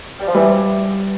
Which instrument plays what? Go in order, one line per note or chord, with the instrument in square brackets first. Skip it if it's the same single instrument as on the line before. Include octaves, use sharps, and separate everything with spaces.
[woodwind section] G3
F3
[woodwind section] E3 [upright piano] G3